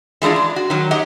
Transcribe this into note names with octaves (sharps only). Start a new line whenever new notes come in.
E3 G#3 A3 D4 F4
D4
F#4
D#3 F#3
G4 D#5 F#5